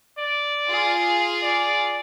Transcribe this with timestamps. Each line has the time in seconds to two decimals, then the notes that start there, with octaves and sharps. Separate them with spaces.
0.18 D5
0.69 F4 G#4
1.43 D5